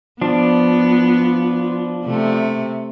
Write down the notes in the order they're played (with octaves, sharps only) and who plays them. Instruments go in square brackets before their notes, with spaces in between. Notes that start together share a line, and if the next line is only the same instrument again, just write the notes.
[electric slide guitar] F3 D4 [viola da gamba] B3
[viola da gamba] C3 A3